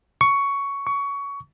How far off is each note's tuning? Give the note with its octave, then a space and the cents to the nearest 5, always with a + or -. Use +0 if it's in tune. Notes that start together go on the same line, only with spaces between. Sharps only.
C#6 +10
C#6 +20